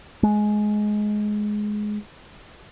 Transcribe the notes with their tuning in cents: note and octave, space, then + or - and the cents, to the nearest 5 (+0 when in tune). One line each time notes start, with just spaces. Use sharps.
G#3 +15